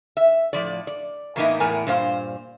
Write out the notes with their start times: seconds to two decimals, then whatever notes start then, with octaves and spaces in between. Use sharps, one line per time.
0.17 E5
0.53 A2 F3 D5
0.87 D5
1.36 A2 E3 A#3 B3 D#4 E4
1.60 E2 A2 A#4 G#5
1.87 G2 A#2 C5 F5